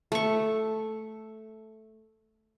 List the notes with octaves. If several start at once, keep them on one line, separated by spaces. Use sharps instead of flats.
A3 C#6